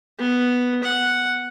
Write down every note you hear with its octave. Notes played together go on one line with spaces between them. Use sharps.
B3
F#5